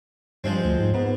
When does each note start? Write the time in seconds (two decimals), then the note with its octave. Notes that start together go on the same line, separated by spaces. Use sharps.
0.44 G2 F3 G#3 C4
0.64 D2
0.79 G#2
0.94 G#2 B3